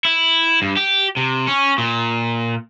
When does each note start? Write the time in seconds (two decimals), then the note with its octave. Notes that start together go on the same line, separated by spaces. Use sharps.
0.05 E4
0.62 G2
0.77 G4
1.17 C3
1.47 C#4
1.78 A#2